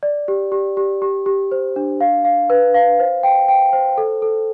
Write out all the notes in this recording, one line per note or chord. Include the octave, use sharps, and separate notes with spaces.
D5
G4
G4
G4
G4
G4
C5
D4
F5
F5
B4
F5
C5
G5
G5
C5
A4
A4